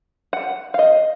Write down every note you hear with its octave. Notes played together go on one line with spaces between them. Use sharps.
F#5
F5
D#5